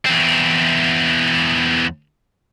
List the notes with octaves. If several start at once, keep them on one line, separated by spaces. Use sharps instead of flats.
E2 C4